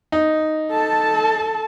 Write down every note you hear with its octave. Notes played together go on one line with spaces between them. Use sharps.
D#4
A4 A5